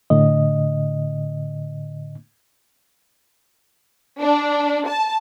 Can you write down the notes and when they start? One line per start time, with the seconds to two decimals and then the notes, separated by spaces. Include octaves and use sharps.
0.10 A2 D3 D#5
4.21 D4
4.89 A5